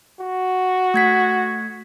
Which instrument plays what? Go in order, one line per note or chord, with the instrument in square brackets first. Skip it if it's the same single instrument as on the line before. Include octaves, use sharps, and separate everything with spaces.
[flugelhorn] F#4
[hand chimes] A3 G#6 B6